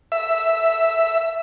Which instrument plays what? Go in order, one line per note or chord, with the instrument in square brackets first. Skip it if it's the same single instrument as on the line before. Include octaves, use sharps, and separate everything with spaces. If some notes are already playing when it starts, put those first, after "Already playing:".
[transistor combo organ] E5